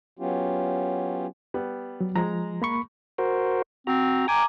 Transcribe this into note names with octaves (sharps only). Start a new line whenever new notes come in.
F#3 B3 C#4 F4 G4
G3 B3
F#3
F3 G#3 A#5
A#3 B5 C#6
F#4 A#4 C5
C4 F#4 A#5
G5 G#5 A#5 D6